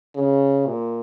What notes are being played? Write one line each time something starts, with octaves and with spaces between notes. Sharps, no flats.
C#3
A#2